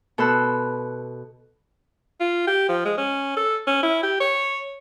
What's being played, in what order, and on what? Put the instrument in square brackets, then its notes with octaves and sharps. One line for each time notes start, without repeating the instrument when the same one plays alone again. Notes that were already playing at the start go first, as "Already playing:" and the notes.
[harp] B2 A4 B5 C6 E6 F#6
[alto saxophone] F4
G4
F3
G#3
C#4
A4
C#4
E4
G4
C#5